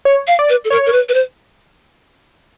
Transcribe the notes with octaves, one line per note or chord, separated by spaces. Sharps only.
C#5
F5
D5
B4
A4
A#4 C#5
A#4
B4
B4
C5